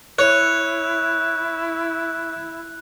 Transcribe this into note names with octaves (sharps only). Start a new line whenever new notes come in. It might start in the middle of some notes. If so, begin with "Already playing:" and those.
E4 C#5 F#6